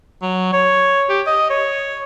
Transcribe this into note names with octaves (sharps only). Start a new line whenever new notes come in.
F#3
C#5
G4
D#5
C#5